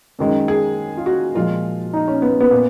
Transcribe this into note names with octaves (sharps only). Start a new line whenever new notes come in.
F#2 D#3 G#3
G#4
F4
F#4
A#2 F3 G#3 F4
D#4
C#4
B3
B3
A#2